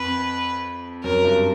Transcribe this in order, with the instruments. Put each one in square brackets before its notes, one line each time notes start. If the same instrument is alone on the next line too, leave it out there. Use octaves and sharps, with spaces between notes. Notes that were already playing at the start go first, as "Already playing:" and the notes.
Already playing: [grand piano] F2 [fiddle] B4
[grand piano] F#2 [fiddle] A#4
[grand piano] G2